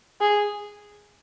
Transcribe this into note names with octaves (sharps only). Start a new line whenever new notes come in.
G#4